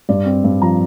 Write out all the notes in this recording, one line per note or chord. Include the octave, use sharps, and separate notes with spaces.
G2 D5
C4
G2
F3 A#5